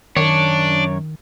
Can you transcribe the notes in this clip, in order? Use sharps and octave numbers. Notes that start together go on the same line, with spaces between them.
F#2 D#3 D4 C#5